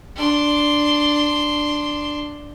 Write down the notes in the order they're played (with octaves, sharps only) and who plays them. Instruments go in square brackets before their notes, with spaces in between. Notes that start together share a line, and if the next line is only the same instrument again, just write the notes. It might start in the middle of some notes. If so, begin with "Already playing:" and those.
[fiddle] D4 C6